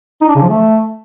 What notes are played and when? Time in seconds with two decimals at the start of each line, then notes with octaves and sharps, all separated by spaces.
0.21 D#4
0.28 D4
0.35 C#3
0.42 F3
0.49 A3